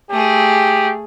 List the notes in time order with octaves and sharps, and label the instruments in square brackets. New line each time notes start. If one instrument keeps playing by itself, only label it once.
[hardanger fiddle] A3 G#4 [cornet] G4